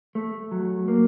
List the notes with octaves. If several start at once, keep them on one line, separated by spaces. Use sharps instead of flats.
A3
F#3
A#3